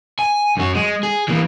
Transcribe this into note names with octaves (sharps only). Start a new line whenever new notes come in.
G#5
F#2 F#4
G#3
G#4
E3 A#3